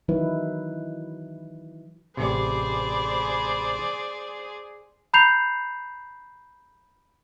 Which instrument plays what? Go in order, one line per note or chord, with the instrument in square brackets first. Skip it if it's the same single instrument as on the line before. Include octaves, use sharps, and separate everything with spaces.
[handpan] D#3 E3 F#3 D#4 E4 B4
[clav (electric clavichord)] A1 C3 [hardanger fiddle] G#4 [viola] C5 D5 [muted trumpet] B5
[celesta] A#5 B5 G6 C7 F7